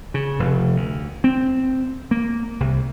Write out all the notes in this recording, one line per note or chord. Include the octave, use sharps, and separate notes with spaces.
C#3
F1
D2
C4
A#3
C2